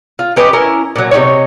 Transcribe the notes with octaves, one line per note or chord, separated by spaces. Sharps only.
F4
C#4 G4 B4 D#5
C#4 E4 A#4
A#2 F#3
C3 C4 D#4 C#5